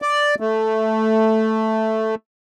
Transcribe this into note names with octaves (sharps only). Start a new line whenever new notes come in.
D5
A3